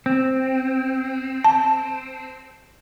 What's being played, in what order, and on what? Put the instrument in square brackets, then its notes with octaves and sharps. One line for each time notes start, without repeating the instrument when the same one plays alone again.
[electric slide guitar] C4
[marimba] A5